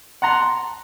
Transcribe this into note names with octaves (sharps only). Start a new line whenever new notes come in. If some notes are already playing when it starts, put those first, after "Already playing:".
F#5 A5 A#5 C6